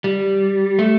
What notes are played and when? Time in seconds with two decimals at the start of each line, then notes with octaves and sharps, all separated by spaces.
0.04 G3
0.79 A3